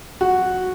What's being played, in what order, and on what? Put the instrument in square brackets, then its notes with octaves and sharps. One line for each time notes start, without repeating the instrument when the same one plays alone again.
[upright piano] F#4